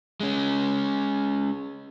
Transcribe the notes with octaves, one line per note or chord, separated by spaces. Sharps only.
G#3 C#4